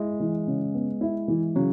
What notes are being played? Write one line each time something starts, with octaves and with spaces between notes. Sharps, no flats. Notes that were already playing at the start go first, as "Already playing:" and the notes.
Already playing: G#3 E4
E3
C#3
B3
E4
E3
C#3 F#3